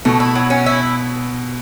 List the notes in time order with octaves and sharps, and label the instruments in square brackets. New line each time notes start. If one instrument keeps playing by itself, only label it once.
[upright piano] B2 [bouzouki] A3
[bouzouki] E4
F#3
C#4
E4